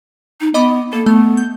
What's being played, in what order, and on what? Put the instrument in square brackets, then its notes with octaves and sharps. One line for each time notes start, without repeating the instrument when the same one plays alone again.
[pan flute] D#4
[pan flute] B3 [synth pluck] D#5 B5 D6
[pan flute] A#3 [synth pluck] A4
[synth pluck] A3 [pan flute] B3
[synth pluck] G6